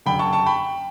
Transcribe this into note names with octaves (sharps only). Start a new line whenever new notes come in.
F#1 F#2 D3 G5 B5
A5 C#6
A5 C#6
G5 B5